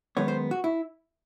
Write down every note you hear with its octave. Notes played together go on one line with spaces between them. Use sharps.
F#2 D#3 G#3 B3 C#5
C5
F#4
E4